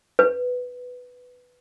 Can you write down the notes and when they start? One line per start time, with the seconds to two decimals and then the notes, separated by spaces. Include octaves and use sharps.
0.19 B4